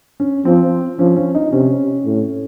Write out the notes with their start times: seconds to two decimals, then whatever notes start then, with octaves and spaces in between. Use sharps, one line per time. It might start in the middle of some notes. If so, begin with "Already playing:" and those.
0.20 C#4
0.45 F3 C4
0.99 F3 C#4
1.16 C#4
1.35 D#4
1.52 C3 C#4
2.05 A2